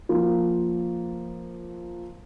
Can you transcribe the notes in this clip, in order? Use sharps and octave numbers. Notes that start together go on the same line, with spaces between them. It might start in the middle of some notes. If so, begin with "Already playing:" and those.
F3 A#3